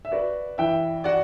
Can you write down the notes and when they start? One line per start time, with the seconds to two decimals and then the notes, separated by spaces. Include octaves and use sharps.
0.05 E5
0.12 F#4 B4 D5
0.58 E3 E5 G5
1.04 F#4 D5 F#5